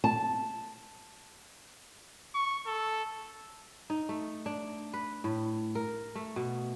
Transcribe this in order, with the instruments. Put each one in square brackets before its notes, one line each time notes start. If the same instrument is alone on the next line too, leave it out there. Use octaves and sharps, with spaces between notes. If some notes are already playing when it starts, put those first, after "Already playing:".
[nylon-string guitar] A5
[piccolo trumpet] C#6
A4
[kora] D#4
A3
D4
B4
A2
A#4
A3
B2